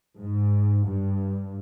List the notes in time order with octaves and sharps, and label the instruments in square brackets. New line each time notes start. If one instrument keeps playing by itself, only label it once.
[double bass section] G#2
G2